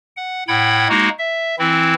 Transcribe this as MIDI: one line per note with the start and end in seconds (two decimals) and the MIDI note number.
0.17 0.43 78
0.48 0.88 45
0.48 0.88 78
0.48 0.88 79
0.48 0.88 83
0.48 0.88 92
0.89 1.09 56
0.89 1.09 58
0.89 1.09 63
0.89 1.09 66
1.19 1.56 76
1.59 1.94 52
1.59 1.94 60
1.59 1.94 64